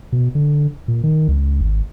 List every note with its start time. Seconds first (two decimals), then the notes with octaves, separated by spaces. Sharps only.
0.12 B2
0.35 D3
0.88 A#2
1.03 D#3
1.28 C#2
1.61 G#1